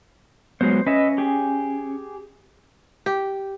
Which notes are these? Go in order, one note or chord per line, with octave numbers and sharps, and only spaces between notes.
F#3 G#3 B3 C5
C#4 B4 D#5 E5
G4 G#4
G4